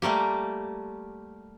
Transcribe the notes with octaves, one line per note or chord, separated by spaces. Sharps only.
G3 A3 A#3 G4